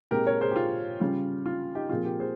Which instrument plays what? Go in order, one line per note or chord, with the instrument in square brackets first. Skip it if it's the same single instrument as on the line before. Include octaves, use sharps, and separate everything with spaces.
[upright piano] A#2 G#3 C4 G4 A#4
A#4 C#5
G#4 C5
G4
F4
C#3 G3 C#4 F4
F4
D#4 G4
A#2 F3 C4 F4 G#4
G4 A#4
G#4 C5